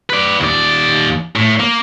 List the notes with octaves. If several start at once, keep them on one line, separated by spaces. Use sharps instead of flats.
B4 D5
D#2 D5
A2
A#3